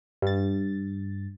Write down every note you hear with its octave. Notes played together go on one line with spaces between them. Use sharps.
G2 A6